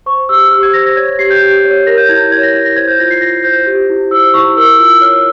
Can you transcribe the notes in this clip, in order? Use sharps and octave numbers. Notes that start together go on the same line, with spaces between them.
C5 C#6
G4 E6
G4 F6
G#6
C5 A#6
A#6
C#5 G#6
G#6
G4 C7
G6
G4
C#5
A#4 A#6
G6
E4 G#6
C#5 G#6
A#6
E4 A#6
A#6
C5 G#6
G6
F4 A#6
C7
F4 A#6
C5 G6
G4
E4
C5 E6
E4 C#6
A#4 E6
F4 E6
C#5 F6